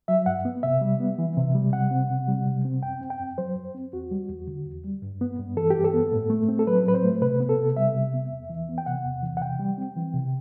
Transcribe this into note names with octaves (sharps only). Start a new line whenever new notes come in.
F#3 E5
G2 F#5
B3
C3 E5
G3
B3
E3
C3
G3
C3 F#5
C4
C3
G3
C3
C4
F#2 G5
C4
G5
F#2
F#3 C5
F#2
C4
E2 F#4
G3
E2
D3
E2
G3
G2
B3
G2
E3 A4
G4
G2
A4
B3
A2
A3
C4
A4
F#3 B4
A2 B4
C5
A3
C3 B4
B3
A4
C3
G3 E5
C3
B3
E2
E3
B3
G5
C3 F#5
E2
E3
F#5
C3 G5
G3
C4
E3
C3